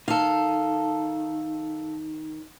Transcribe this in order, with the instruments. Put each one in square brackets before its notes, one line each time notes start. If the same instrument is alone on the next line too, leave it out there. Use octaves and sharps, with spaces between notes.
[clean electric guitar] D#3 [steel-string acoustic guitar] A4 F5